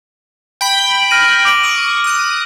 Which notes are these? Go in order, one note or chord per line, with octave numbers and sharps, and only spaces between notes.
G5 B5
F6 A#6 D#7
D6 D7 F#7
C#6 D#6
D#6 F#6